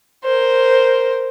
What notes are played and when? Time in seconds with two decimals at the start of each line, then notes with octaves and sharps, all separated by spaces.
0.24 A#4 C5